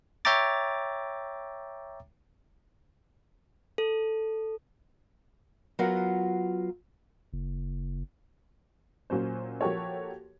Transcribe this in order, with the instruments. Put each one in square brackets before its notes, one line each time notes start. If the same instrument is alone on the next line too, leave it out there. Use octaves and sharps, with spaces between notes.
[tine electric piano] C#5 E5 G5 A#5 D6 A6
[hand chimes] A4
[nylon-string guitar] F#3 B3 F4 A#4 F#5
[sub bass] F#1
[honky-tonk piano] A#2 F#3 C#4 C5
F3 A#3 F#4 G4 A4 C#5